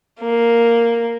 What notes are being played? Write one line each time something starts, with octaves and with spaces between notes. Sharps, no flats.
A#3